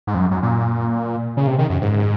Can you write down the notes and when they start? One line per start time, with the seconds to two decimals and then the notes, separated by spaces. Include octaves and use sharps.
0.07 G#2
0.14 F2
0.19 F#2
0.31 F#2
0.43 A#2
1.37 C#3
1.47 C3
1.58 D#3
1.70 F#2
1.81 G#2